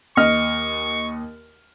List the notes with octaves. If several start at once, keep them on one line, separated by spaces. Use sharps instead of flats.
D#2 D#5 C#6 F6